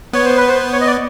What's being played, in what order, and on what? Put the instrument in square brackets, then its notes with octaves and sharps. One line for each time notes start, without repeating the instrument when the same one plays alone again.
[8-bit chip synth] B3 [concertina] C#5
[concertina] C5
B4
C5
C#5
D#5
D5